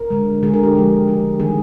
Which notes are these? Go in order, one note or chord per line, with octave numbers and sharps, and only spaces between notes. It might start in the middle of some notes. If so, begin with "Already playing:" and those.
Already playing: A#4
D3 G#3
D3 G#3 G#4
A#4
G4
D3 F3 G#3
D3 F3 G#3
D#3 G3 A#3 G#4